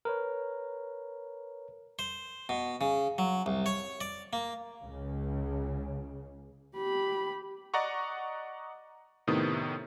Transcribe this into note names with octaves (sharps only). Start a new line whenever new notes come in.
A#4 B4 C#5
C5
B2
C#3
F#3
C2
C#5
D5
A#3
C#2 C#3
G4 B5
D5 D#5 F#5 A#5 C#6
A2 C3 D#3 B3 D#6